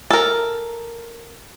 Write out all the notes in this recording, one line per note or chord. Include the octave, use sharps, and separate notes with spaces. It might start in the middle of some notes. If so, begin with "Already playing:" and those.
A4 A#4